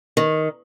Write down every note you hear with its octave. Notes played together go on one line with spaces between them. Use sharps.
D#3